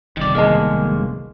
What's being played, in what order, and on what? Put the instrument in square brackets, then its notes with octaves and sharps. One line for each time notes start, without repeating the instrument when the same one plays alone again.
[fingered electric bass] G1 C2 F2 [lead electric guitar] D#3 D5
[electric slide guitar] F#2 D#3 [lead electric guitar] G#3 A#3 [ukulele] G#4 D#5 A5